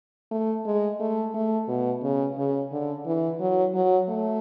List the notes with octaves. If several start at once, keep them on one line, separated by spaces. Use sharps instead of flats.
A3
G#3
A3
A3
B2
C#3
C#3
D3
E3
F#3
F#3
A3